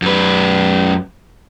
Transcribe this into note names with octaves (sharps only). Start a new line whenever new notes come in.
F#2 B4